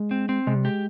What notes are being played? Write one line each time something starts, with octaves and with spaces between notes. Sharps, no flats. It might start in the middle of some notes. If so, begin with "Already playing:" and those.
Already playing: G#3
C4
C4
C3 G#3
G3
G#3 G4